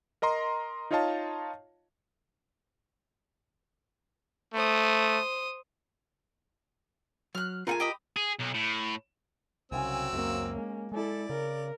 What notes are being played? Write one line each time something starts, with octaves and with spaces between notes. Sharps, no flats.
A#4 D#5 A#5 C6
D#4 F4 C#5 D#5 F5 A5
A3 C5 D#6
F#3 F6 F#6
A3 F4 G#4 A#4 F#5 G#5
G4 D#5 B5
G#4
B1
A2
C2 C#3 F#3 C4 G#5 E6
C#2 F#2 A#3 C#4
G#3
G#3 E4 A4 D5
C#3 A#4